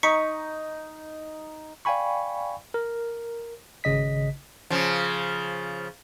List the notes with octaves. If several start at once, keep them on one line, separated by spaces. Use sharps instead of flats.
D#4 C#6 B6 C#7
D5 F5 G5 G#5 B5 C#6
A#4
G#1 C#3 D#5 B6
C#3 F3